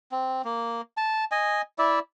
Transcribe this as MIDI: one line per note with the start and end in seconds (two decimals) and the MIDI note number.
0.12 0.42 60
0.45 0.81 58
0.97 1.24 81
1.32 1.62 75
1.32 1.62 80
1.78 1.99 64
1.78 1.99 74
1.78 1.99 76